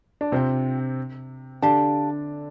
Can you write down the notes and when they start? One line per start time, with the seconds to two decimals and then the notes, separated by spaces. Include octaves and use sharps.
0.21 D4
0.32 C3 C4 F4 C5 G5
1.62 D3 D4 G4 F5 A5